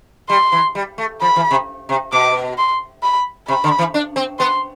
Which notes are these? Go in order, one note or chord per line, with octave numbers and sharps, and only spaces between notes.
G3 C6
E3
G3
A3
F3 B5
E3
C3
C3
B2 D6
C6
B5
C3 B5
D3
E3
D4
C4
B3 C6